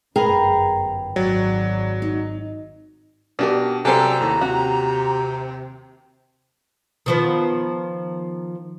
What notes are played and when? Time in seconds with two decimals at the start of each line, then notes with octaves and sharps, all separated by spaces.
0.16 G1 F#2 G#4 A#4 B4 G5 A#5
1.16 G#1 F#3 D5
2.02 D#4
3.39 B2 D4 G4 A#4
3.85 C3 F#3 G3 G#4 A4 C5 A#5
4.21 D#2 A2
4.41 C3 F#4
7.06 D#3 F3 B3